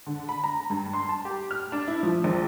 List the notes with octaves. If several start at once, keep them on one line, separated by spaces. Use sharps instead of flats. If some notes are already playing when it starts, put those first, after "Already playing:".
D3
B5
A#5
G2
C6
A5
G4
F6
D4
E4
F3
A#1